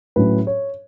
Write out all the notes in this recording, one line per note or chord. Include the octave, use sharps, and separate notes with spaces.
A2 F#3 C#4 B4
C#5